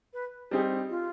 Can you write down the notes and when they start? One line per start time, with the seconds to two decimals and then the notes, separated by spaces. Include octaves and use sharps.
0.13 B4
0.51 G3 C4 D#4 G4 G#4
0.89 F4